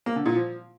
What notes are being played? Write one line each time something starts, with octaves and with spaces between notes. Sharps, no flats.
A#3
D3
A#2
F3